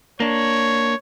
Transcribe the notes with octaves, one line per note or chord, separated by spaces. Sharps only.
A#3 D4 C#5